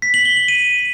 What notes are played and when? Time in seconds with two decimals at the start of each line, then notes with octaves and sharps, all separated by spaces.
0.02 B6
0.14 F#7
0.25 G7
0.37 F#7
0.48 D#7